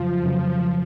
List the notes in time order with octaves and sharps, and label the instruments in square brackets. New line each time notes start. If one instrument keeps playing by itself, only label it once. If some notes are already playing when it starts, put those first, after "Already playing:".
Already playing: [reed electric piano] F2 C#3 F#3 [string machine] F3
[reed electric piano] F2 C#3 F#3